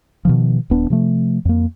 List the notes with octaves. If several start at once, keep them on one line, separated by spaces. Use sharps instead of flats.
B2 D#3 F3
D#1 B3 D4
C3 F3 A3
F2 A#3